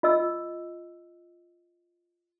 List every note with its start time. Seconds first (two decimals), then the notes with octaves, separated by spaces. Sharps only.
0.03 F4 D#5 E6